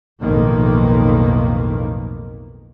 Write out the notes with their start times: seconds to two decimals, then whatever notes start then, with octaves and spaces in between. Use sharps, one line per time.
0.21 B1 F2 A2 D#3 A#3